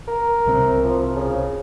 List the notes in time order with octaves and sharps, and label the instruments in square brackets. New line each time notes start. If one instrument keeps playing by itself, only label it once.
[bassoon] A#4
[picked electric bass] C2 C3 C4
[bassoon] F3
C#3